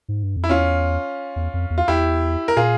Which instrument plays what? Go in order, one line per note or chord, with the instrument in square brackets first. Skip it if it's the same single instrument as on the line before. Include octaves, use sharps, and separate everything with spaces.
[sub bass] G#2
G2
F2
[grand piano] E4
[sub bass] E2 [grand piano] C#4 F4
[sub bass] E2
F2
E2
[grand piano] F4
[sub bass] E2 [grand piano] E4 G4
[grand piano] A#4
[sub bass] A#2 [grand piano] F4 G#4